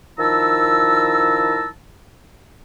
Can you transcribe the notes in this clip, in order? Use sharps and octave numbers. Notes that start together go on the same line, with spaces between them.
D#3 F3 E4 A5 A#5 E6